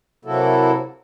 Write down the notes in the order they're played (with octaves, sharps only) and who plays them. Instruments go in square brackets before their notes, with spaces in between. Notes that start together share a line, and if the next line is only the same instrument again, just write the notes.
[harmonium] C3 F#3 A#3 E4 F#4 A4